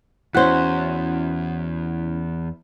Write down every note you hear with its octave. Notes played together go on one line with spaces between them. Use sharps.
E2 C#4 E4 F#4 C5 F#5 F#6